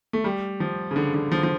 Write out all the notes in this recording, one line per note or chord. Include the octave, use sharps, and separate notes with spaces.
A3
G3
F3
C#3
D3
D3
F3
F3